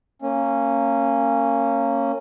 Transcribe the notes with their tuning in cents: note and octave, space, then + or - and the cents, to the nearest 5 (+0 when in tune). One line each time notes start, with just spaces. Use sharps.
A#3 -25 C#4 -10